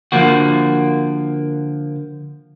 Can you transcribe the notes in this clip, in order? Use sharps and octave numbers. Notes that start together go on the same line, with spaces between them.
D3 F3 A#3 F#4